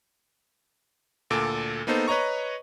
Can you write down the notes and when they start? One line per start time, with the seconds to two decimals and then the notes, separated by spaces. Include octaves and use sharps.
1.30 D2 A#2 A4 D6 D7
1.87 A#3 B3 D#4 A4 C5
2.08 B4 C#5 D#5 A#5 C#6